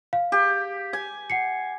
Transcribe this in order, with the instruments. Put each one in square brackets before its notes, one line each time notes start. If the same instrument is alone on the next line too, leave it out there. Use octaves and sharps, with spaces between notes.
[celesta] F5
[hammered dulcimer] G4
G#5
[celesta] F#5 C7 C#7